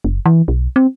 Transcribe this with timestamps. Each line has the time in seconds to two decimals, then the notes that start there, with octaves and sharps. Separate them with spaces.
0.04 F#1
0.26 E3
0.48 B1
0.76 C4